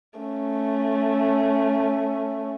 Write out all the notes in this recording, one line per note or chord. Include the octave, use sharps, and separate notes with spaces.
A3 C#4